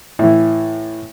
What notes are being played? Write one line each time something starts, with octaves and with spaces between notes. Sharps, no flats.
A2 E3